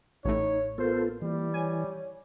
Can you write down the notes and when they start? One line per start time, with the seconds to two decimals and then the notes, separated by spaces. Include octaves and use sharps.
0.25 A1 A2 D#4 C#5
0.78 B3 F4 A4 A#4 C5
1.22 E3 G3 A#3
1.54 C#5 G#5